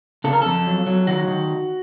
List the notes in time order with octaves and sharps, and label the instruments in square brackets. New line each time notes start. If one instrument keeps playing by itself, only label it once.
[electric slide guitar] C#3 A4
A#4
F2 A4
F#3
F#3
D#3 F#4
D#3